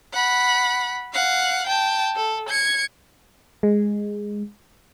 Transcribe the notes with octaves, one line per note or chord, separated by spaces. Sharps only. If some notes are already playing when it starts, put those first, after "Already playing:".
F#5 B5
F5 F#5
G5 A5
A4
G#6 C#7
G#3